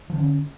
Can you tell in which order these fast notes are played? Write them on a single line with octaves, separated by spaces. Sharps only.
F3 D3 B3 C#4